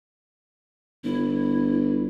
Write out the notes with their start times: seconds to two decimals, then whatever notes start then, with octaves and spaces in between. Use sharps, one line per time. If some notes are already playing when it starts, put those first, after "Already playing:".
1.04 G1 E4